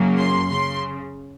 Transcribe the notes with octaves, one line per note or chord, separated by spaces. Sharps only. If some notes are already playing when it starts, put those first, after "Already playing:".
Already playing: F#2 C#3 F#3 A#3
C6
C#3 C6